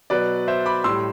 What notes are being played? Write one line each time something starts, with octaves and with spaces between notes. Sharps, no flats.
B2 F#3 B4 D5
C5 E5
B5 D6
A2 G3 C6 E6